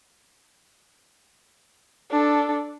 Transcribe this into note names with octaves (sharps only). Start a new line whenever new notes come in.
D4 A4